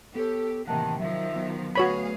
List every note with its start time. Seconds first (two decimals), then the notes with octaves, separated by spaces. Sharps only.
0.15 B3 G4 A4 C#5
0.67 A2 C3 D#3 E3 A#3 F#5 A5
0.99 D#3 F3 F#3 E5
1.36 F#3 B3
1.75 D2 F#4 G#4 B4 C#5 F5 B5